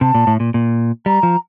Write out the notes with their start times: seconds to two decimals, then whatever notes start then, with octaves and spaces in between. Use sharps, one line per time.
0.01 C3 A5
0.15 A#2
0.27 A2
0.40 A#2
0.54 A#2
1.06 G3 A#5
1.23 F3